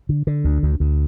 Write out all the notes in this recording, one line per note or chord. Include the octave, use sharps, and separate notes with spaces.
D3
D3
D2
D2
D2